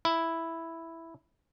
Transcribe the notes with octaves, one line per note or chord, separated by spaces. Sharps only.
E4